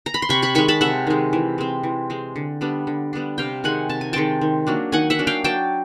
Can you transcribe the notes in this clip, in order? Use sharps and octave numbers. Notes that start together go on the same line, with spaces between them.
A#5
B5
C6
C3 B5 C#6
B5 C#6
D#3 G#3 B5 C#6
A5 B5
C3 E5 F#5
D#3 G#3
E3
G#3 C4
E3
G#3 C4
D3
G3 B3 D4
D3
G3 B3 D4
C3 F5 G5
D#3 G#3 C4 F#5 G#5
C3 A5
G#5
D#3 G#3 C4 G5 A5
D#3
F#3 A#3 D4
D#3 F#5 G#5
E5 F#5
F#3 A#3 D4
F5 G5
F#3 G5 A5